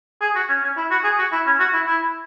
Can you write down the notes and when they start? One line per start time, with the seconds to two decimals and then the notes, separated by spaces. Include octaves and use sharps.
0.21 G#4
0.35 F#4
0.49 C#4
0.63 C#4
0.77 E4
0.91 F#4
1.04 G#4
1.19 F#4
1.32 E4
1.46 C#4
1.60 F#4
1.73 E4
1.87 E4